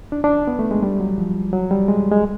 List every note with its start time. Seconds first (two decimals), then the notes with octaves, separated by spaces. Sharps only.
0.12 D4
0.24 D4
0.47 B3
0.59 A3
0.71 G#3
0.83 G3
1.00 F#3
1.18 F3
1.53 F#3
1.71 G3
1.88 G#3
2.12 G#3